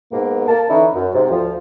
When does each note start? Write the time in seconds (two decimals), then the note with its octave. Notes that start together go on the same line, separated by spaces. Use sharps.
0.12 G#2 B2 A#3
0.48 A#3 A5
0.69 D3 E3 C#4 D#4 E4
0.94 F#2
1.14 G#2 C3
1.31 D2 F3